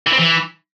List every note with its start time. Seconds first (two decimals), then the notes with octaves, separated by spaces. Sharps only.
0.07 E3
0.13 C4
0.19 E3